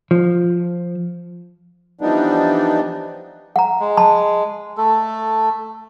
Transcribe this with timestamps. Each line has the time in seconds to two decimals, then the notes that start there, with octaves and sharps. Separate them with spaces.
0.11 F3
2.01 E3 F3 G3 B3 D4 D#4
3.56 F#5 A#5
3.80 G#3
3.97 A5 B5
4.77 A3 A4